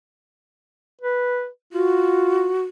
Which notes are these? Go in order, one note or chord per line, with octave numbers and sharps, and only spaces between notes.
B4
F4 F#4